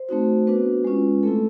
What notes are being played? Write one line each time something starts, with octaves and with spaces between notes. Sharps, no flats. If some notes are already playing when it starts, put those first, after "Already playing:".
Already playing: C5
A3 C4 D#4 F#4
B3 D4 F#4 B4
G#3 C#4 F4
A3 C4 E4 A4